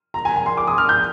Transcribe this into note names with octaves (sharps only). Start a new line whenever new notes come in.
A#5
G#5
G#5
C6
D6
D#6
F6
G6